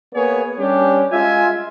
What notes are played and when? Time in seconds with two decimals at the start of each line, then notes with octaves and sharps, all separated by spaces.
0.15 A#3 B3 G#4 C#5
0.58 G3 C#4 D4 G4
1.11 G#3 F4 E5 G#5